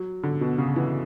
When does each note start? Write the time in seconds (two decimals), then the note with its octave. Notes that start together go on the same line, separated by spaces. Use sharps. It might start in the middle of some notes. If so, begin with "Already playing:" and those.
Already playing: F#3
0.23 D3
0.41 B2
0.58 C#3
0.76 E3